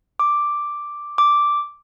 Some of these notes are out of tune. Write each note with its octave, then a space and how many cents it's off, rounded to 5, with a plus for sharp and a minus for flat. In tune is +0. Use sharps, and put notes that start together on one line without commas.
D6 +0
D6 -5